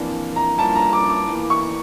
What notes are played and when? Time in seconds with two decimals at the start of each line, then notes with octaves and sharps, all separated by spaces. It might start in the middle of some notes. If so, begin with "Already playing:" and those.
Already playing: F2 E3 A#3 D4
0.36 A#5
0.58 G2 F3 A#3 C#4 E4 A5
0.75 A#5
0.93 D6
1.10 D6
1.28 E2 E3 A#3
1.50 C#6